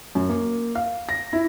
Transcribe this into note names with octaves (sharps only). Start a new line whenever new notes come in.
F#2
A#3
F5
A#6
E4